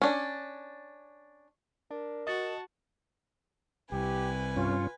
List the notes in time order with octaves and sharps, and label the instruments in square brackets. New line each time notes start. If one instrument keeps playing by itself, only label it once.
[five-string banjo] C#4 D4
[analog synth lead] D4 [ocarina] A#4
[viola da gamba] F#4 [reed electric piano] D#5 A6 [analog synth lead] A5
[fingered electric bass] C2 [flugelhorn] G4 [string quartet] B4 G#5
[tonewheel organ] G2 C#4 [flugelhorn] F4